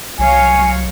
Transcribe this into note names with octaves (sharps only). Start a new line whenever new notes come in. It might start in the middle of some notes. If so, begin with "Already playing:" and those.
C2 F#3 C#5 F5 G#5